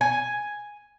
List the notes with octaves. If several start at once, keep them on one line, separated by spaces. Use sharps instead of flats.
G#5